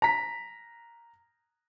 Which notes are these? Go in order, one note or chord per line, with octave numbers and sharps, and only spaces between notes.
A#5 B6